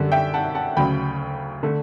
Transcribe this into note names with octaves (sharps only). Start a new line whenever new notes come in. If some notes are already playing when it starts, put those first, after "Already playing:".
Already playing: F#2 D3 G3
E5 G5
F#5 A5
F#5 A5
D2 C#3 F#3 G5 B5
D3 A3